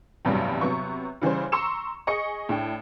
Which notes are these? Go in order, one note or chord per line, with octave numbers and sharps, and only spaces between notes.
A1 E2 G2 C3 F#3 G3
C3 F#3 B3 C#6
C#3 E3 G3 C#4 C5
A#5 C6 C#6 E6 C#7 E7
G#4 D#5 C#6 C#7
A2 D4 G5